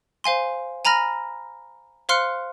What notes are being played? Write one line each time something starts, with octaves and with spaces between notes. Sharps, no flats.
C5 F5 G#5 C6
G#5 A#5 B5 F6 A#6
C5 F5 C6 F6 F#6 C#7